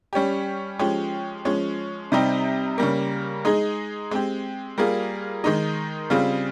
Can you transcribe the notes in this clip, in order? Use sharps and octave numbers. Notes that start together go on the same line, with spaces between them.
G3 C#4 G4
F3 G#3 C#4 G4
F3 G#3 C#4
C3 G3 C4 D#4 G4
C#3 G3 A#3
G#3 D#4 G#4
G#3 C4 G4
G3 A#3 F4 G#4
D#3 G#3 D#4
C#3 G3 C4 F4 G#4